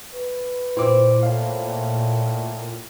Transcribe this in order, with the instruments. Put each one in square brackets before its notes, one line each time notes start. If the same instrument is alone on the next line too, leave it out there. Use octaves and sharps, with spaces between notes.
[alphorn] B4
[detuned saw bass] A#2 [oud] C4 [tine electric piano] E4 D6
[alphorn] A2 [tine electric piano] F5